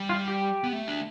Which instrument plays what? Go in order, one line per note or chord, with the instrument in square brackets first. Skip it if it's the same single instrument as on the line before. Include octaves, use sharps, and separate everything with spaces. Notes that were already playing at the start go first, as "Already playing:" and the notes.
Already playing: [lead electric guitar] G3
[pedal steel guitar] F4
G4
[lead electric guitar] B3
A3
D4